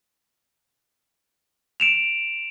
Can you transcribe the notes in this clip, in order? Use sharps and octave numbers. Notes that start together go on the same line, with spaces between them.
D7 E7 F7